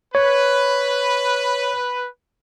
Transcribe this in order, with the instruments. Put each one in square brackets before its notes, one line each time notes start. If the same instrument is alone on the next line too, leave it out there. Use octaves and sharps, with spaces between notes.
[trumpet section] B4 [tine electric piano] C#5